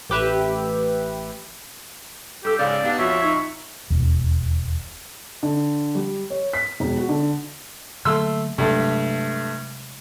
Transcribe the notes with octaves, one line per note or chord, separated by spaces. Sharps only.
A1 G4 B4 E5
G2 G4 A4 E6
C#2 G#2 C#3 D5 F5
B3 D4 D#4 G4 F5
A#1 F2 F4 F#4 C#5 E5
D#4 C#6
E1 D#2
D3
G3
C#5
B6
E1
F#4
D3
D3 F#3 A3 A#3 C6 E6
G2 C3 F#3 G#3 A3